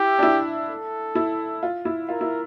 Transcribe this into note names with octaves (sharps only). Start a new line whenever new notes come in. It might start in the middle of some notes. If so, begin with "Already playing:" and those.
Already playing: E4 G4
D4
E4
A4
E4
F4
E4
F4 A#4
E4